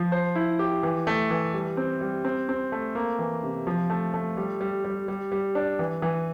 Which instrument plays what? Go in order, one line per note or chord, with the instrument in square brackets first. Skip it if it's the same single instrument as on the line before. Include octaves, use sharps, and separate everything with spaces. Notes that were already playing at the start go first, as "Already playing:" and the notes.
Already playing: [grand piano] F3
C5
E4
G4
E3
A3
E3
G3
C4
G3
C4
C4
A3
A#3
E3
C3
F3
A3
A3
G3
G3
G3
G3
G3
D4
E3
E3